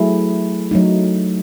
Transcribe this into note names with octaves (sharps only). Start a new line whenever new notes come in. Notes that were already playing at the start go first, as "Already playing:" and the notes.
Already playing: F#3 A3 E4 G#4
F#3 A3 D#4